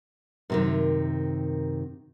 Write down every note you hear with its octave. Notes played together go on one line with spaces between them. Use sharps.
F#2 C3 D#3